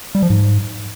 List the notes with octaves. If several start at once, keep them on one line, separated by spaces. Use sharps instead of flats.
G3
F3
G#2